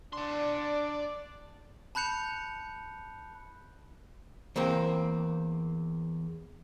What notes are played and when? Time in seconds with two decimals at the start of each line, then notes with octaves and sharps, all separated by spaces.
0.13 D4 D5 C6
1.95 A5 B5 F#6 G6 C#7 F7
4.56 E2 A#3 C4